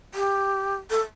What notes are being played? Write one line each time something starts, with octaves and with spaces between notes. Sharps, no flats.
G4
A4